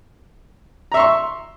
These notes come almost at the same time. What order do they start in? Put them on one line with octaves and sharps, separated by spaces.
A#5 E5 C6 C#6